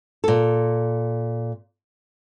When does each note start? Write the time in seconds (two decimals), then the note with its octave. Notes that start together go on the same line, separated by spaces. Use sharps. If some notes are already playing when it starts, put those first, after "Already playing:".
0.24 A#2 A4